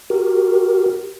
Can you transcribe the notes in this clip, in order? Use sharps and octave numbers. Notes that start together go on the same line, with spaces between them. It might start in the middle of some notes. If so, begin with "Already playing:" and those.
F#4 G4 A#4